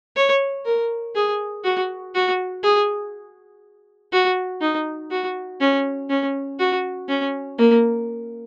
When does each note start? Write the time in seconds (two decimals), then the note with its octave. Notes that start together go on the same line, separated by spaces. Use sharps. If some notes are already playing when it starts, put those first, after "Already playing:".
0.16 C#5
0.66 A#4
1.15 G#4
1.64 F#4
2.15 F#4
2.63 G#4
4.12 F#4
4.61 D#4
5.11 F#4
5.60 C#4
6.10 C#4
6.59 F#4
7.09 C#4
7.58 A#3